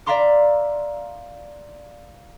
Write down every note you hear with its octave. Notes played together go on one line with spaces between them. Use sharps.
D5 E5 F5 A#5 C6 D6